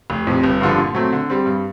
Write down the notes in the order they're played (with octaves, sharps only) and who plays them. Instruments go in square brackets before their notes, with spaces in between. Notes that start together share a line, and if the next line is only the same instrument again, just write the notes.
[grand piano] F1
F2 C3
G1
G2 D3 F3
A#2
F#3 A3 C4
D3
G3 C4
G2